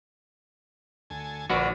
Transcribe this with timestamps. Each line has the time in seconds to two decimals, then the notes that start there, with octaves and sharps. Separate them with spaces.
1.10 D2 A4 G#5
1.50 A#1 D3 F3 A#3 F#4 B4 D5